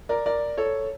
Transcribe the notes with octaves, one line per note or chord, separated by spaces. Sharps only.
A#4 D5
A#4 D5
A4 C#5